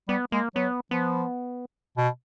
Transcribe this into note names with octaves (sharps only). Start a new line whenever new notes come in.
G3 B3
G#3 A#3
F#3 B3
F3 B3
B2